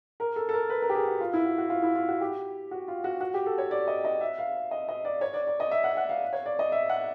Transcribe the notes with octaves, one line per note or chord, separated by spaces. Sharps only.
A#4
A4
A4
A#4
B4
A#4
G4
G#4
F#4
F4
E4
F#4
F#4
F4
E4
F4
F#4
G4
F#4
F4
F#4
F#4
G4
A4
C#5
D5
D#5
D#5
E5
F5
D#5
D#5
D5
C#5
D5
D5
D#5
E5
F#5
F#5
F5
C#5
D5
D#5
E5
F#5